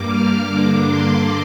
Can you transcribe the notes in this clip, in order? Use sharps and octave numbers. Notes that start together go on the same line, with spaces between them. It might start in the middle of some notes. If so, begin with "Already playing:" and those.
Already playing: G2 G3 A#3 D6
F6
G2 D3 A#3 D4 D6
C6